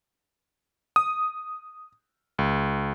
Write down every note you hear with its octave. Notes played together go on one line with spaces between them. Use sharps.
D#6
C#2